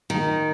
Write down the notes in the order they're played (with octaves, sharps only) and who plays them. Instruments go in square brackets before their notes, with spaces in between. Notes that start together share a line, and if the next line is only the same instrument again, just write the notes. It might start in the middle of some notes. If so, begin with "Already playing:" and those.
[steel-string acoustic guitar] D#3